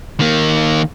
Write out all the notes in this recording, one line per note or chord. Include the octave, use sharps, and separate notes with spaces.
D#3 A#3